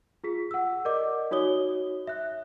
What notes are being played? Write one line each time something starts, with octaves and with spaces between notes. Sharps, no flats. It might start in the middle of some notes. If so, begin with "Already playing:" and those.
F4 G#4 B6
F#5 E6
A#4 D5 D#5 D6
D#4 F#4 C#5 D#6 G7
E5 F#6